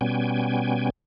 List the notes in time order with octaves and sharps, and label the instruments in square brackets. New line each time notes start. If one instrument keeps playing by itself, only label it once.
[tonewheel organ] B2 G3 B3 C#4 G5 G#5